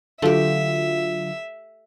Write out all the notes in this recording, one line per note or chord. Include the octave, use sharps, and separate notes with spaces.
D3 F#3 A3 F4 G4 E5